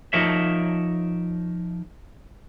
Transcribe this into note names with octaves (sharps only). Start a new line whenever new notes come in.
F3 D#4 A#4 C#5 E5